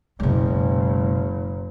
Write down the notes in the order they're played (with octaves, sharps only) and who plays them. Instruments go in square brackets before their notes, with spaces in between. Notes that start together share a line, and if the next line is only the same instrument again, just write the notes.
[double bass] F#1 [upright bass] B2 G#3